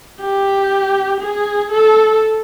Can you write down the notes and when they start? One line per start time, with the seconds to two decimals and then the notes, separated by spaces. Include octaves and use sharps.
0.21 G4
1.21 G#4
1.71 A4